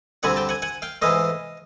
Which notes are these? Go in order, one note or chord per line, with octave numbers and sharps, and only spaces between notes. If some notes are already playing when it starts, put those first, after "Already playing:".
D2 D3 G3 C4 F#5 G#5
G5 A5
F#5 G#5
F#5 G#5
F5 G5
G#2 E3 A3 D#5 F5